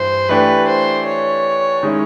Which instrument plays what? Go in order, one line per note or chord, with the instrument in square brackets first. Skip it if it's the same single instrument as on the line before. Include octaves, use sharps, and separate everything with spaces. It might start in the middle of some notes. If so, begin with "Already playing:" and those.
Already playing: [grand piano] G2 E3 [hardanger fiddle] C5
[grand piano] E3 A3 D4 G4 [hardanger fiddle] B4
[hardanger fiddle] C5
C#5
[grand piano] D#3 G#3 C#4 E4